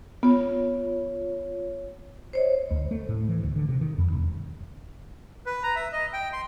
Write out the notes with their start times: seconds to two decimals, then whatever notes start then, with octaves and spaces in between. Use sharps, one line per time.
0.23 B3 F4 C#5
2.33 C5 C#5 D#5
2.71 D2
2.91 A3
3.09 A2
3.29 E3
3.43 D2
3.56 D3
3.69 C3
3.81 D#3
3.98 F2
4.12 E1
5.46 B4
5.63 A#5
5.76 E5
5.92 D#5
6.13 G5
6.33 C6